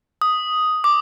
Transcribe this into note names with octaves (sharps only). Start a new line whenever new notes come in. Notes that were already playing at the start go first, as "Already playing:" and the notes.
D#6
D6